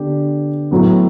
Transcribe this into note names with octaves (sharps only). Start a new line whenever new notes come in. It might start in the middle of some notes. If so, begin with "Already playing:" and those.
Already playing: D3 B3 D4 G4
A2 F#3 B3